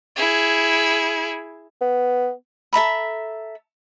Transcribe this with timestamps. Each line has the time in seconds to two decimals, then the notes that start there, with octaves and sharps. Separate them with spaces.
0.16 E4 G#4
1.81 B3
2.73 A4 E5 A#5 B5